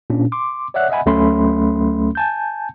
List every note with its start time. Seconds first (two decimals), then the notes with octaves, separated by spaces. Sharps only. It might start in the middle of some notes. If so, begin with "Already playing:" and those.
0.10 A#2 C#4 D4
0.32 C6 D6
0.74 C#5 D5 E5 F#5 F#6
0.90 D#5 E5 F#5 G#5 B5
1.06 D2 F#3 A3 C#4 B5 C6
2.15 G#5 A5 G6